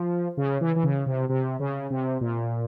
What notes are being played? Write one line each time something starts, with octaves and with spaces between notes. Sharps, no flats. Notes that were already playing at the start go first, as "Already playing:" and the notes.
Already playing: F3
C#3
E3
E3
C#3
C3
C3
C#3
C3
A#2